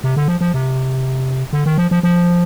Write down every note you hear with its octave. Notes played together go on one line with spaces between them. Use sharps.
C3
D3
F3
F3
C3
D3
D#3
F3
F3
F3